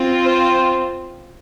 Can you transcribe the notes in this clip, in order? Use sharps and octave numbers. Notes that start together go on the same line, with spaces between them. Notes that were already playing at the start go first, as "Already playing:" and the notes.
Already playing: C4 F4
C5